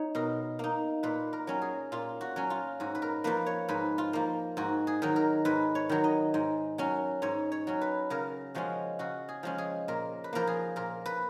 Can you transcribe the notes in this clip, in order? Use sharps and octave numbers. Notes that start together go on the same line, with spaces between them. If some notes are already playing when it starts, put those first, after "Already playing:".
Already playing: D#4 C#5
B2 A#4
A#3 D#4
A#2 B4
A#4
F#3 C#4
G#4
A#2 F4
F#4
F#3 C#4
F4
G#2 F#4
B4
A#4
F3 A#3 B4
C#5
G#2 B4
F4
F3 A#3
G#2 F#4
G#4
D#3 F#3
A#4
G#2 B4
C#5
D#3 F#3
D#5
G#2
F#3 C#4
G#2 C#5
C#5
F#3 C#4
B4
C#3 A#4
F3 G#3 C#4 F#4
C#3 F#4
G#4
F3 G#3 C#4
G#4
A#2 A#4
B4
F3 A#3 A#4
G#4
A#2 A#4
B4